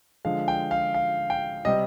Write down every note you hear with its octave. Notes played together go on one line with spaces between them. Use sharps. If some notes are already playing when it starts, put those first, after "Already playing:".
D3 F3 G#3 F5
G5
F5
F5
G5
C3 G3 C4 D#5